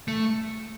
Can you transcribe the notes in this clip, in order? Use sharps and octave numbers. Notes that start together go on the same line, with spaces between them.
A3